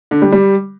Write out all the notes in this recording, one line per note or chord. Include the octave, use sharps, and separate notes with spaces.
D3
G3
G3